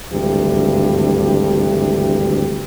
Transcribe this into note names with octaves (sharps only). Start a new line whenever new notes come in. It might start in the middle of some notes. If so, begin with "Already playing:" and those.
G#1 D2 G2 E3 G4